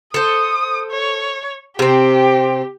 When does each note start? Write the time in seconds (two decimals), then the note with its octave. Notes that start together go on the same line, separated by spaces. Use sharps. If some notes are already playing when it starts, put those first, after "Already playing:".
0.14 A4 C5 D#6
0.91 C#5
1.79 C3 C4 G4